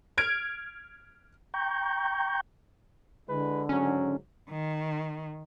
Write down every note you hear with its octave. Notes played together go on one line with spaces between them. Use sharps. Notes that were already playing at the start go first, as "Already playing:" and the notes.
F6 G#6 D7
G5 A#5 C#6 G6
D3 G#3 E4 B4
G#2 C#3 F#3 C#4
D#3